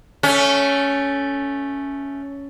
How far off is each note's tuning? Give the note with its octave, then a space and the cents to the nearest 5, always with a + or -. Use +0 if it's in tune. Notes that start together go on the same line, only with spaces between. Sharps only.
A3 +0 C#4 +10